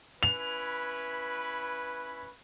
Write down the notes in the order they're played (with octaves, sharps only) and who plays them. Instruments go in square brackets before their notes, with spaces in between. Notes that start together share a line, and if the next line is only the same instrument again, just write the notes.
[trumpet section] C#4 E4 B4 [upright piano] F7